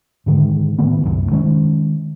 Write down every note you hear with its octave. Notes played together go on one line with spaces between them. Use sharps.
G#2 D3 D#3 G#3
A2 D#3 A3 B3
C2 F#2
D#3 G#3 A#3 C#4